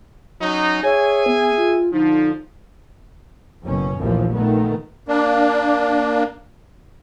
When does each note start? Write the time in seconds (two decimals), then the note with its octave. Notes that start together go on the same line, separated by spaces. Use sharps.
0.42 F#3 C#4 D#4
0.84 G#4 C#5 E5 G#5
1.27 B3
1.57 F4
1.93 D3 F3 D#4
3.64 F#1 B2 C#4
3.98 A#1 D#2 A2 E3 F3
4.34 A#2 D#3 A3 B3
5.08 A#3 D4